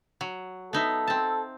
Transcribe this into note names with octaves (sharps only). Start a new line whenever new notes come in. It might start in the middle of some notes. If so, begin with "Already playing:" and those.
F#3
B3 D#4 A4 E5
C4 A5